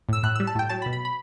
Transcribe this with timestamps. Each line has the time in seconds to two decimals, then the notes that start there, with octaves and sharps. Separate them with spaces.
0.09 A2 E6
0.23 A2 F#6
0.36 G3 E6
0.47 A5
0.55 A2 G5
0.69 F#3 A5
0.82 B5
0.86 B2
0.93 B5
1.05 B5